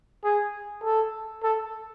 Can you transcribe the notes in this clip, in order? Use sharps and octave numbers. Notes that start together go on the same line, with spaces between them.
G#4
A4
A4